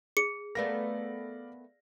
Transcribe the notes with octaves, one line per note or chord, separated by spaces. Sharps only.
G#4 C#7
A3 B3 A#4 D5 F5 A#6